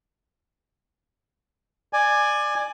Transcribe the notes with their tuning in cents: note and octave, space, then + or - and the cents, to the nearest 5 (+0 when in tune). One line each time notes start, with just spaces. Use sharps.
D5 +20 G#5 +0